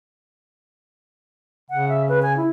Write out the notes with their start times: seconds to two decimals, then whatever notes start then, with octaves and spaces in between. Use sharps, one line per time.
1.70 C#3 F#5
1.89 E5
2.09 B4
2.22 G#5
2.37 E4